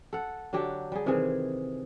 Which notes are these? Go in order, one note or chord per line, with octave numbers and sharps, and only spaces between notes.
A4 F#5
D3 F#3 D4 G4
G3 G#4
C3 D#3 E3 G#4